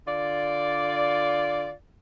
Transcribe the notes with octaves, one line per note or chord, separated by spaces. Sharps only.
D3 F4 D5